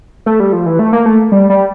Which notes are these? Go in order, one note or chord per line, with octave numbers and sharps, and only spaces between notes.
A3
G3
F3
E3
A3
A#3
A3
G3
G3